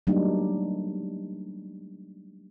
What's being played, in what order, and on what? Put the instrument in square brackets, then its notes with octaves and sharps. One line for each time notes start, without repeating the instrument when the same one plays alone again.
[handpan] F#3 G3 A3 A#3 D4 D#4